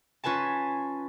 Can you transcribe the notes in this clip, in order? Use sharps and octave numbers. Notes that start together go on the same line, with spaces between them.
C#4 F4 B4 G#5 A5